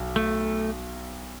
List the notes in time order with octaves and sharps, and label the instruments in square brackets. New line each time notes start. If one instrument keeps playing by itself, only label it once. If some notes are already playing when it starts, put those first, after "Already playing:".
Already playing: [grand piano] B1
[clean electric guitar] A3